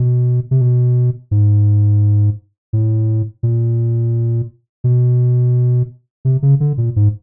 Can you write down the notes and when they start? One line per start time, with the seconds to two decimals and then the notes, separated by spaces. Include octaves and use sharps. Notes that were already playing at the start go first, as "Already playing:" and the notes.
Already playing: B2
0.51 C3
0.61 B2
1.31 G#2
2.73 A2
3.43 A#2
4.84 B2
6.25 C3
6.42 C#3
6.60 D3
6.78 A#2
6.96 G#2